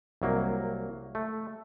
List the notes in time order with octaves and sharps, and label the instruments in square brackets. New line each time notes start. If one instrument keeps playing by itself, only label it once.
[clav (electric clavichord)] C2 F#3 A#3
A3